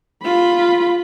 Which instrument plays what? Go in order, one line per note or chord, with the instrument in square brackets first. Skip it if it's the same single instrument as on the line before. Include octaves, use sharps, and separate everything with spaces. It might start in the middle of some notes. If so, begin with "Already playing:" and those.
[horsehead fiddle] F4 B5